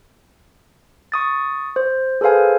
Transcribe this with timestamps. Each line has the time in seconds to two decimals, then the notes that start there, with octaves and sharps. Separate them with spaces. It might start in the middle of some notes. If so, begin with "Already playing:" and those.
1.12 C#6 D#6 A6
1.76 C5
2.21 G#4 A4 B4 C5 F5 G#5